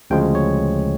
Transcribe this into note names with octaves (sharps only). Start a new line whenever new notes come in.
D2 C#3 F3 G#3 G5
C#5